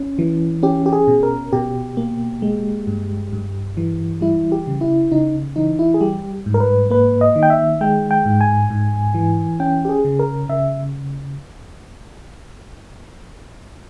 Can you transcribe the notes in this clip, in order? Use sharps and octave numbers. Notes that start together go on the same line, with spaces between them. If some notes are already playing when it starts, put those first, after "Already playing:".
Already playing: C#4
E3
C#4 G4
G4
G#4
B2
A#4
B2 G4
A#3
G#3
G2
G2
E3
G3 E4
G4
C#3
E4
C#3 D#4
E3 D#4
E4
G#4
G3 G4
G#2
A#4
B4
A#3 B4
D#5
D#3
G5
E5
G#3 G5
G5
G#2
G#5
G#2
E3
C#4 G5
G4
G#4
C#3
A#4
C#3 E5